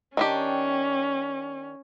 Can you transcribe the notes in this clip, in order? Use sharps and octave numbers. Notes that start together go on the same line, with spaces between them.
D#3 C#4 D4 G4